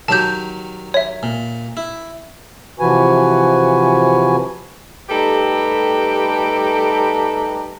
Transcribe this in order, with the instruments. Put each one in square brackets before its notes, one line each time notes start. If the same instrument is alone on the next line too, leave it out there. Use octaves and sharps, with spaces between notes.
[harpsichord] D#3 F#3 G4 [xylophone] A5 G6
[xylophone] C#5 E5
[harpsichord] A#2
E4
[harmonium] C3 E3 F3 F#4 B4 G#5
[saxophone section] G3 A3 D#4 G4 A4 B4